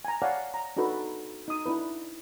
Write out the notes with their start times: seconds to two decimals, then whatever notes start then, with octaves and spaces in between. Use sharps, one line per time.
0.05 G#5 A#5
0.22 C#5 D5 F5 F#5 G#5 A5
0.54 A#5
0.77 D4 D#4 F#4 A4 B4
1.48 D#4 D#6
1.66 D4 E4 B4